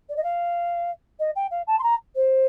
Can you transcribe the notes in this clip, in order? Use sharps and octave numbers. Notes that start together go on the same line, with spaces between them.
D5
D#5
F5
D#5
G5
F5
A5
C6
A#5
C5